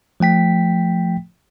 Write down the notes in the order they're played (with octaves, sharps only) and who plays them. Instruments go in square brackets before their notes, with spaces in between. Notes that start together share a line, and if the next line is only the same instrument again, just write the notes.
[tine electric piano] F3 A3 G5 B6